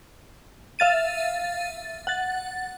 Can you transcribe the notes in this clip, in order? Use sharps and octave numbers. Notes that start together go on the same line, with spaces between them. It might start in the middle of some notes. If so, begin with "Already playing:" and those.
E5 F5 A6 D#7
F#5 A6